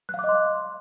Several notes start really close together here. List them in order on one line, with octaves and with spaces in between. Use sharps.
F#6 F5 D6 D#5 C6